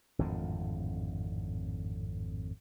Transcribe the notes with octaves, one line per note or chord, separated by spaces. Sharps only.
G#1 F2 A2 D3